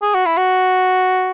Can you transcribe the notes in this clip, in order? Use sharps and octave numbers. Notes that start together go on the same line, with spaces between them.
G#4
F#4
E4
F#4